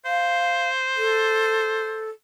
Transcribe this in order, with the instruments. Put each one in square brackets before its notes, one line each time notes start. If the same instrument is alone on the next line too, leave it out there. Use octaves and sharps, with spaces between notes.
[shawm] C5 [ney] F5
[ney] A4